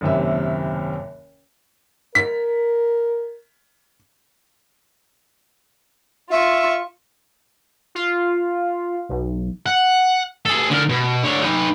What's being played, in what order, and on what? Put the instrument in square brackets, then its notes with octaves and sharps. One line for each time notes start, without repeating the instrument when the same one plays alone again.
[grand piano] F#1 D#2 C3 E5
[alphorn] A#4 [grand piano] B6
[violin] F4 C#6 [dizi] E5
[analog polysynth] F4
B1
[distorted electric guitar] F#5
G#4 A4
D3 A#4
B2
D3 C#5
D#4 B4